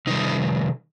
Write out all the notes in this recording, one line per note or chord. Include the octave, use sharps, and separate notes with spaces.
C3 D#3 G3 D#4